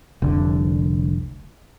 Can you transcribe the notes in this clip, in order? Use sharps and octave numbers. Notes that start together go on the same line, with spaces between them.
F1 C2 D3